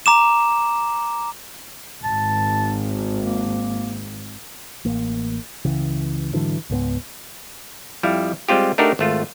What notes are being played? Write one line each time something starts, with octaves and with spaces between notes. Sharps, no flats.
A#5 D6 E7
G#1 A5
A#3
A1 A#3
C#2 C#3 E3
G#2 D3 E3 F#3
C#2 G#2 A3 B3
F2 G3 E4 F5
G3 G#3 C4 F4 G4
A3 D4 D#4 F#4 G4 A#4
G#1 A3 F4